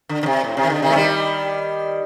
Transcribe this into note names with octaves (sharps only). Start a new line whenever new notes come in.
D3
D3
C3
A2
C3
D#3
D3
C3 D#3
A3
D#3 G3